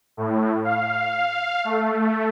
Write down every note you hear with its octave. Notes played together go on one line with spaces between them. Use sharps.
A2
F5
A3